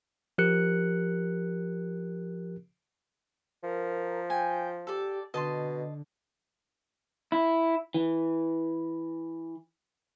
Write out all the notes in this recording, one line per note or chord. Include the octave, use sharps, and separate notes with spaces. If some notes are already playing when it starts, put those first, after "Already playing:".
F3 G4 A#4 F#6 C#7
F3 A#4
G5 G#5
G4 A4 D5
B2 D3 D#5 A5 C6
E4
E3